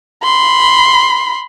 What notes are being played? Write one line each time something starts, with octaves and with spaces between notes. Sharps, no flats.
B5 C6